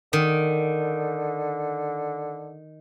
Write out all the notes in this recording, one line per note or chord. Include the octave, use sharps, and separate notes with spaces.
D3 D#3